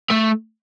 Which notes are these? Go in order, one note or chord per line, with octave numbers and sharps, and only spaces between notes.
A3